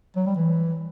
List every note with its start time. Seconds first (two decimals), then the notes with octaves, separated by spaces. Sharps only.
0.16 F#3
0.26 G3
0.36 E3